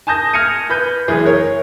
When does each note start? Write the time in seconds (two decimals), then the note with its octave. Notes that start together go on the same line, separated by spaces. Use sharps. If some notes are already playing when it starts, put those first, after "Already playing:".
0.07 G#5 A5 D#6 G6 A#6
0.33 F6 G#6 A#6 C#7 D#7
0.70 B4 B5 G6
1.08 F#1 E3 G#4
1.26 A#4 C#5